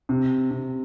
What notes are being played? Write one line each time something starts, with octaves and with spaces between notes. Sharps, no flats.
C3
C3